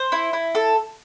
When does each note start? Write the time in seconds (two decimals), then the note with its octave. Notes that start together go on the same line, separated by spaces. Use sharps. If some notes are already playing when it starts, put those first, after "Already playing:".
Already playing: C5
0.12 E4
0.33 E4
0.55 A4